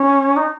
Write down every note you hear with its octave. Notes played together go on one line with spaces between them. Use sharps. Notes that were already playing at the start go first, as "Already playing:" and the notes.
Already playing: C#4
D#4